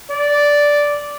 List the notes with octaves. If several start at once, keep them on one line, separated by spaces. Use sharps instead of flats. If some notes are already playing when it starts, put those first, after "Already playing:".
D5